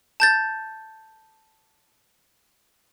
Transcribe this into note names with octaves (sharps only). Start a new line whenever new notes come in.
A5 G6 A6